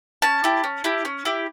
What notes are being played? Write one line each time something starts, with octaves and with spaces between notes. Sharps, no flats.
C#4 A5
E4 G4
C#4
E4 G4
C#4
E4 G4